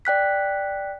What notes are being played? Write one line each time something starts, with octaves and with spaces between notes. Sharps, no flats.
D5 G5 F#6 B6